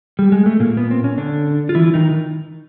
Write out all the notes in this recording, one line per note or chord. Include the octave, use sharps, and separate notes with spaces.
G3
G#3
A3
A#2 A#3
B3
C4
C#4
D3 D4
F4
E3 E4
D#3 D#4